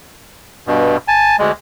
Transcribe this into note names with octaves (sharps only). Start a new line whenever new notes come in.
G2 B2
G#5 A5
D2 G#3